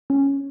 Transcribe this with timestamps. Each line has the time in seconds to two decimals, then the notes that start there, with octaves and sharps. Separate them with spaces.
0.10 C#4